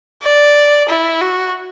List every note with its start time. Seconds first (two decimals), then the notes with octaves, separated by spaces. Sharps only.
0.23 D5
0.89 E4
1.21 F#4